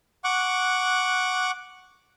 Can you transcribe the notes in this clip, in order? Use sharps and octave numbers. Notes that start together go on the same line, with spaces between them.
F#5 C#6 D6 F#6